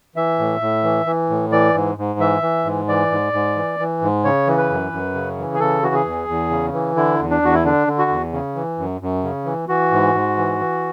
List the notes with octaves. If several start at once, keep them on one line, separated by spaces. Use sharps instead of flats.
E3 E5
A2
A2
E3
E3
A2
E3 D5
G#2
G#2
E3 E5
E3
G#2
E3 D5
G#2
G#2
E3
E3
G#2
C#3 C#5
E3
B4
F#2
F#2
C#3
E3
G#4
C#3 A4
E3 F#4
G#4
E2
E2
C#3
E3
D3 E4
E2
D4
E2 F#4
E4
D3 D4
D3
F#4
E2
C#3
E3
F#2
F#2
C#3
E3
E3 F#4
G#2
G#2
E3
E3